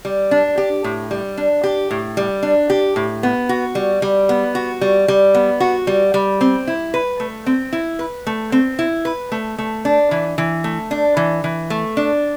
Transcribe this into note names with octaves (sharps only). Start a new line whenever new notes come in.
G3
D4
G4
A2
G3
D4
G4
A2
G3
D4
G4
A2
B3
F#4
G3
G3
B3
F#4
G3
G3
B3
F#4
G3
G3
C4
E4
B4
A3
C4
E4
B4
A3
C4
E4
B4
A3
A3
D4
E3
E3
A3
D4
E3
E3
A3
D4